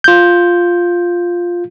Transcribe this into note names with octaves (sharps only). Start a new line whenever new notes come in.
F4 G6